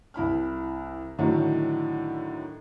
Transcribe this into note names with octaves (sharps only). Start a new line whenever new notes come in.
C2 E4 B5 F6
A2 D3 D#3 F#3